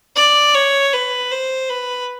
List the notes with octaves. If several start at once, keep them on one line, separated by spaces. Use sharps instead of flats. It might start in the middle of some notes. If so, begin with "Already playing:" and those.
D5
C#5
B4
C5
B4